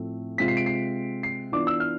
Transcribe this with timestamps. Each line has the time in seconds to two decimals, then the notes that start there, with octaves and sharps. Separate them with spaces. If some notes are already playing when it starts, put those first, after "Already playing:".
Already playing: A2 F3 A3 C4
0.38 C3 G#3 C4 F4 B6
0.48 C7
0.57 D7
0.66 C7
1.23 C7
1.52 E3 B3 D4 F4 D6
1.67 E6
1.80 F6